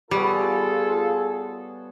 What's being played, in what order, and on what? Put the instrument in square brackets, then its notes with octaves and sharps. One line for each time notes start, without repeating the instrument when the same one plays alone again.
[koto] G3 [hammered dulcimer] B3 B4 C#5 [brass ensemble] F4 G#4 A4